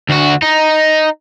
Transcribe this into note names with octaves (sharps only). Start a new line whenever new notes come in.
D2 F#4
D#4